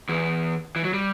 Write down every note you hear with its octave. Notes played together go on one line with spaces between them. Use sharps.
E2 E3
E3
F#3
G3